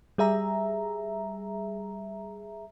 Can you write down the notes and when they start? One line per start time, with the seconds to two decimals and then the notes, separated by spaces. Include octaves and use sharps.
0.18 G3 G#4 E5 A#5